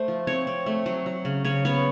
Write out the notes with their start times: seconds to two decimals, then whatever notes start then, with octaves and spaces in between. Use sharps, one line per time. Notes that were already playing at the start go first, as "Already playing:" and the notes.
Already playing: A3 C5
0.08 F3
0.27 C4 C#5
0.47 C4
0.66 A3
0.86 F#3
1.06 F#3
1.25 C#3
1.44 C#3 C#5
1.65 B3 C#5